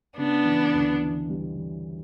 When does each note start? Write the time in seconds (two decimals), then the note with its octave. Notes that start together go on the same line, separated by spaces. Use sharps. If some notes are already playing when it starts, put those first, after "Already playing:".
0.17 C#3 B3 D4
0.46 E3
0.74 D2
1.02 E3
1.29 G3
1.57 E3